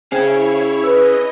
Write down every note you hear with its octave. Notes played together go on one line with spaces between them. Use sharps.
C#4 E4 G#4 C5 C#5 G5 G#6
B4 D#5 E6